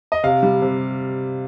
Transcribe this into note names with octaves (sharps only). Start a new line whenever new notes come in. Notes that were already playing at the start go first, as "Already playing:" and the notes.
D#5
C3 F5
G3
C3